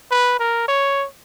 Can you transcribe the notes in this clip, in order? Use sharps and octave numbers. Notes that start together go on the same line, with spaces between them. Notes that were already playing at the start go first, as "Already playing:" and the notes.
B4
A#4
C#5